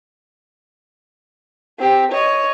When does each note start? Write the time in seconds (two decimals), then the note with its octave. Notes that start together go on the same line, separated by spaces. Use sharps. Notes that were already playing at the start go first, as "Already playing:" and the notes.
1.80 C4 G4
2.12 C#5 D#5